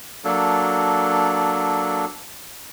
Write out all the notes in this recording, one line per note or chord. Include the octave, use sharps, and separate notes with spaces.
F#3 A#3 D4 A4